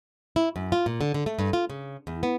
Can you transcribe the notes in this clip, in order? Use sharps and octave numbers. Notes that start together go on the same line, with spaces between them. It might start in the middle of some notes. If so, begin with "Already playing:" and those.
E4
F#2
F4
A#2
D3
D3
A3
G2
F4
C#3
E2
B3